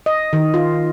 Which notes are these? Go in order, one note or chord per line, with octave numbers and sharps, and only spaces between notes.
D#5
D#3
F4